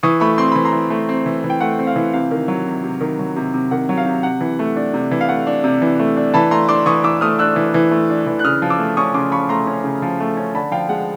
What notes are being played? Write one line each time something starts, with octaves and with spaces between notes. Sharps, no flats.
E3 C#6 D#6
A3 B5 C#6
C4 C6
E3 B5
A#5 C6
E3
A3
C4
E3
E3
G5
A3 F#5
C4
F5
E3
C3 F5
D#3
F#3
C3
C3
D#3
F#3
C3
C3
D#3 F#5
F#3
F5
C3
C3 F#5
E3
A3
D4
C3
E3
F5
A3 F#5
D4
C3
E3
A3
D4
E3 A5 B5
A3 A#5 C6
D4 C6 D6
E3 C#6 D#6
E3 D6 E6
A3 D#6 F6
D4 E6 F#6
E3
E3
A3
D4
E3
F#6
C#3 D#6 F6
F3
D6 E6
A3
C#4 C#6 D#6
C#3 C6 D6
F3 B5 C#6
A3 A#5 C6
C#4
C#3
F3
A3
C#4
D3 A5 B5
F3 F5 G5
G#3 F#5